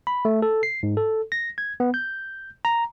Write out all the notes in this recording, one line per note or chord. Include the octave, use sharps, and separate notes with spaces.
B5
A3
A4
C7
G#2
A4
A#6
G#6
B3
G6
A#5